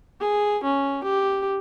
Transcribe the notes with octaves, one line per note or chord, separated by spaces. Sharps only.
G#4
C#4
G4